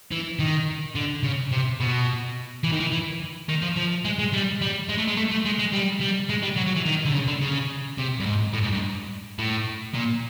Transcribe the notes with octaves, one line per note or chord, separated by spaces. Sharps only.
E3
D#3
D3
C#3
C3
B2
E3
D#3
E3
E3
D#3
F3
F3
G#3
G#3
G3
G3
G#3
A3
G#3
A3
A3
G#3
G#3
G3
G3
G#3
G3
F#3
F#3
E3
D#3
D3
C#3
D3
C#3
C3
G2
G#2
A2
G#2
G2
A2
A#2